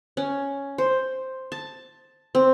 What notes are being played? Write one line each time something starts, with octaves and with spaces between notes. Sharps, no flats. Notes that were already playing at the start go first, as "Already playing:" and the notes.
C#4
C5
A5
C4